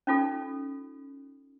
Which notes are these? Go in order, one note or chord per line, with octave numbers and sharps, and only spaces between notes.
C#4 D#4 F4 A4